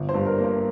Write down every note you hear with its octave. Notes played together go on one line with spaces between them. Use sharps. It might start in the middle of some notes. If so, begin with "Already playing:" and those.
Already playing: G1
C5
G2
A#4
A#3 C5